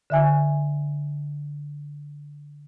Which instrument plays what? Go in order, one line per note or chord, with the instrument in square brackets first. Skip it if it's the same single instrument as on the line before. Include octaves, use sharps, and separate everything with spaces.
[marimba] D3 E5 G#5